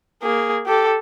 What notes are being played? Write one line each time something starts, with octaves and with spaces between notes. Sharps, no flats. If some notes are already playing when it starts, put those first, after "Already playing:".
A#3 G#4
G4 A4